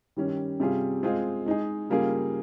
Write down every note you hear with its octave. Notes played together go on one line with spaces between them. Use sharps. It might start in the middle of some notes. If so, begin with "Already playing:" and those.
D#3 G3 C#4
C3 G3 C#4 F4 G#4
G#3 C4 F4 G#4
G#3 D#4 G#4
C#3 G3 A#3 F4 G#4